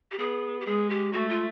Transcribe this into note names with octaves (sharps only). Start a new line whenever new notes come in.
G4
B3 G#4
G4
G#3 G#4
G4
A3 F#4
F4